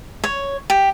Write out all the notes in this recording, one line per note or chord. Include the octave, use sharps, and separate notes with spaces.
C#5
G4